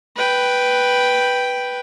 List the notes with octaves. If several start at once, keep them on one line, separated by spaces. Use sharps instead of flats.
B4 G5